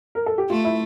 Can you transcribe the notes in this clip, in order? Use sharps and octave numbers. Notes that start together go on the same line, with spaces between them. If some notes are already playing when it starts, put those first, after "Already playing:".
A#4
A4
G4
A3 F4
E4